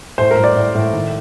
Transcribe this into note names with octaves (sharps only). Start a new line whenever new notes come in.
A2 C5
A#4
A2
D5
A2
A2
D#3